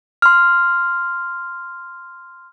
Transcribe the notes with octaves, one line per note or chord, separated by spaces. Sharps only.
C6 F6